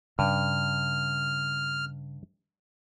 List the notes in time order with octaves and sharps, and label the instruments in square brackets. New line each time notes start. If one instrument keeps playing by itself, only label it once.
[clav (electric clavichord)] G2 [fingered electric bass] C#3 [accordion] F6